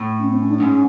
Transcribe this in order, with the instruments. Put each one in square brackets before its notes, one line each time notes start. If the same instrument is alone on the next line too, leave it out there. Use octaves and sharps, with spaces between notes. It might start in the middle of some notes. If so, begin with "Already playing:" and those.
Already playing: [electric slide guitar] A2
[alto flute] C#4
C4
C#4
D4
[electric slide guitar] G#2 [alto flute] C#4